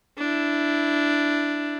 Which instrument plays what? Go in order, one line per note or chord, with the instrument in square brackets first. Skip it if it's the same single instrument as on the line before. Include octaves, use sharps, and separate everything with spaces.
[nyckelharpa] D4 E4